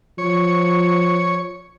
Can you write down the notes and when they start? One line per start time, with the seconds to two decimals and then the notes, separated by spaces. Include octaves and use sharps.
0.18 F3 C#5